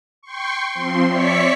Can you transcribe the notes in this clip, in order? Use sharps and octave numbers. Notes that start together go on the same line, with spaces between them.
G5 C6 C#6
F3 C4 C6
C#5 D5 E5 C#6 B6 C#7